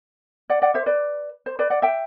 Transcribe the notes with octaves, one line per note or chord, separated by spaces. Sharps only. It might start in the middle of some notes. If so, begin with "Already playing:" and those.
D5 F#5
D5 F#5
C5 E5
B4 D5
C5
B4 D5
D5 F#5
E5 G5